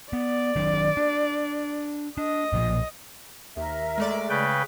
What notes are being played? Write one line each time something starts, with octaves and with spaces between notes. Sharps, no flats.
B3 D5
D#3 F#3 D4
D4
D4 D#5
B1 A#2 F3
D#2 A#4 E5
G#3 A3 D5
C#3 B4 G5